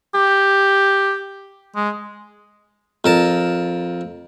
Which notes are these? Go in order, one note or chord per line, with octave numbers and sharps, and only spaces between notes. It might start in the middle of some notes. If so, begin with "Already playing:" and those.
G4
G#3
F2 A#4 A5